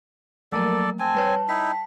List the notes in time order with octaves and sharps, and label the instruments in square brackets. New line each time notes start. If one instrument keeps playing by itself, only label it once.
[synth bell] F3 A3 A#4 [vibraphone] F#3 A#3 [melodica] A4 D5
[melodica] C4 G#5 [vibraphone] A5
[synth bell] G3 B4 C#5
[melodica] D#4 E4 [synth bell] G5 B6